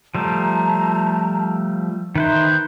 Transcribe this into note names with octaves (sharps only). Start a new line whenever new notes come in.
F3 G3 A3 A5 A#5
D#3 D#4 B4 C5 E5